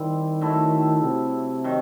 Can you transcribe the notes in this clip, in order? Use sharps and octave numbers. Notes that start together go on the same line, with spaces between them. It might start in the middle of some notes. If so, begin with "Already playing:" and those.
Already playing: D#3 G3 C4 E4
F#3 A3 E4 A4
C3
D#3 F#3